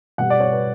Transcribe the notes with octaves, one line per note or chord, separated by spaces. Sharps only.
B2 G3 B3 F#5
D5
C#5
B4